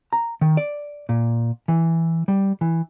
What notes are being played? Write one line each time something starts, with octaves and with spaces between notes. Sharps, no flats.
A#5
D#3
D5
A#2
E3
G3
E3